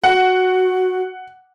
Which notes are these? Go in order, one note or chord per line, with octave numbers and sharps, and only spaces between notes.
F#4 F#5